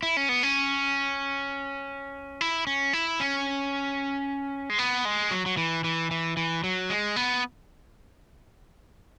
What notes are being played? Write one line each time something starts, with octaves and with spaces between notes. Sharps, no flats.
E4
C#4
B3
C#4
E4
C#4
E4
C#4
G#3
B3
G#3
F#3
F#3
E3
E3
E3
E3
F#3
G#3
B3